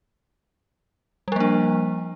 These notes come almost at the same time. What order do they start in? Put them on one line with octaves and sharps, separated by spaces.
G3 F3 A#3 D4